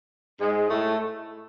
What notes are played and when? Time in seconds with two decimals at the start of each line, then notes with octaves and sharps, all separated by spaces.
0.39 G#2 G#3
0.69 A2 A3